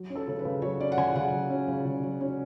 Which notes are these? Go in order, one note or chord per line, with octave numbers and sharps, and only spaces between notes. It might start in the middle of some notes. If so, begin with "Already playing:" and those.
Already playing: F#3
C#4
A4
C#3
B4
C#3
F#3 C#5
C#4 D5
F#5
C#3 G#5
C#3 F#5
F#3
C#4
C#3
C#3
F#3
C#4